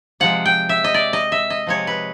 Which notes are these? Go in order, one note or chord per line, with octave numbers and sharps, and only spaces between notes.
C3 F3 G#3 F#5
G5
E5
D#5
D5
D#5
E5
D#5
C3 F3 G#3 C#5
B4